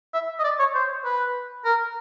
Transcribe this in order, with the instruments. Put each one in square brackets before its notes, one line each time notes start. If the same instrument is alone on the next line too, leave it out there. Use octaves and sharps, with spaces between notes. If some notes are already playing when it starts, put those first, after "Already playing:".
[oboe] E5
D#5
D5
C#5
C5
B4
A#4